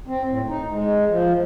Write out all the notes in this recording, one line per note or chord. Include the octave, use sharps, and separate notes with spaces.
C4
A2
D#4
G#3
F3